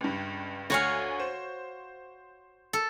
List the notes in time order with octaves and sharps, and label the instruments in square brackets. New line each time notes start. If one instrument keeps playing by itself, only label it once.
[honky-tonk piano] C#2 G2
[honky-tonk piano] D2 G#5 [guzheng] F#4 C#5 F5
[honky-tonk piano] C5
[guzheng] A4